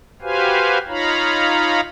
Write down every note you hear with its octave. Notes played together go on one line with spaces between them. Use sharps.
F#4 G4 B4 C5 F5 G#5
D#4 F4 C#5 F5 A#5 B5